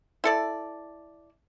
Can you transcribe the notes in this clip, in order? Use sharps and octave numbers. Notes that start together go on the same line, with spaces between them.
E4 A4 D5